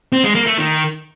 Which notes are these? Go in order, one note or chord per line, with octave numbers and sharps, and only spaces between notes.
C4
G#3
A#3
A3
D#3